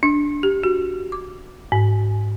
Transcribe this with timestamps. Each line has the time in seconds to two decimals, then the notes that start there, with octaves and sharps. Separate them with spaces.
0.03 D4
0.43 G4
0.64 F#4
1.12 D6
1.72 G#2